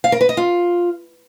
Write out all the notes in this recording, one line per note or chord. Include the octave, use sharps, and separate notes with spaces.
F5
A#4
B4
D#5
F4